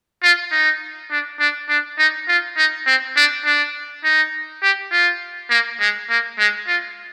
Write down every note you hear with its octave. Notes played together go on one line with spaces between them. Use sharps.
F4
D#4
D4
D4
D4
D#4
F4
D#4
C4
D4
D4
D#4
G4
F4
A#3
G#3
A#3
G#3
F4